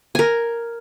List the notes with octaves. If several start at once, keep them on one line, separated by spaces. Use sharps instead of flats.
A#4 G#5